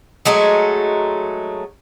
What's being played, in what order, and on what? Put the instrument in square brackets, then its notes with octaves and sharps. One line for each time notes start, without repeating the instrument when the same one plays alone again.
[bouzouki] F#3 G#3 A3 D#4